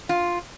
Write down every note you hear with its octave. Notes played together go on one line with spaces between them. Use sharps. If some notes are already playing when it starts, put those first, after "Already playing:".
F4